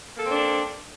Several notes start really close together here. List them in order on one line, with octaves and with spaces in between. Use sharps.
A#3 A4 C4 D4